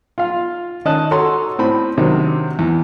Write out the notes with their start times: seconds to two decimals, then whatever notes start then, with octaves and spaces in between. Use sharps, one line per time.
0.18 F4 F5
0.85 D#3 C#4 D#5 A5 D#6 F#6
1.11 F#4 A4 C#5 A#5 C6
1.59 A2 C4 B5
1.98 C3 D#3 F#3 C4 D4
2.59 E2